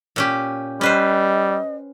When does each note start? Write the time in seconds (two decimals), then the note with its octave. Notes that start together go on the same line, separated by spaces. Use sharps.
0.16 A#2 C#4 G4
0.81 G3 C#4 B4 C5 D#5